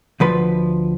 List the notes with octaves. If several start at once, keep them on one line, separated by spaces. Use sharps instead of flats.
D2 F3 B4